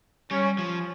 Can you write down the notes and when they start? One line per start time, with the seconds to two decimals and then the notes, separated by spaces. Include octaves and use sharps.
0.31 G3 C#4
0.58 F3